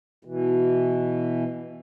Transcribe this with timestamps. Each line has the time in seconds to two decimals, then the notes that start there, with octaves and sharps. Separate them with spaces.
0.25 B2 E3